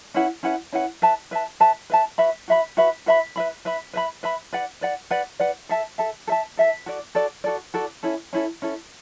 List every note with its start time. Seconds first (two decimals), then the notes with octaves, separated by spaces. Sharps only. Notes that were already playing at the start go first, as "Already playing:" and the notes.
0.14 C#4 E4 B4 F#5
0.43 C#4 E4 B4 F#5
0.72 C#4 E4 B4 F#5
1.02 B4 E5 A5
1.31 B4 E5 A5
1.60 B4 E5 A5
1.90 B4 E5 A5
2.18 F#4 B4 E5 B5
2.48 F#4 B4 E5 B5
2.77 F#4 B4 E5 B5
3.06 F#4 B4 E5 B5
3.36 B4 E5 B5
3.65 B4 E5 B5
3.93 B4 E5 B5
4.23 B4 E5 B5
4.53 B4 D5 F#5
4.81 B4 D5 F#5
5.11 B4 D5 F#5
5.40 B4 D5 F#5
5.69 A4 E5 A5
5.98 A4 E5 A5
6.27 A4 E5 A5
6.57 A4 E5 A5
6.86 F#4 A4 D5
7.15 F#4 A4 D5
7.44 F#4 A4 D5
7.74 F#4 A4 D5
8.03 C#4 E4 A4
8.33 C#4 E4 A4
8.62 C#4 E4 A4